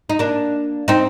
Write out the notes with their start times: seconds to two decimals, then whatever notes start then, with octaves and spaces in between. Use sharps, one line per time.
0.09 D#4
0.19 A#3 D4
0.88 C4 D#4